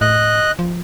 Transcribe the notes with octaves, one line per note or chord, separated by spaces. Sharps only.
A2 D#5 F#6
F3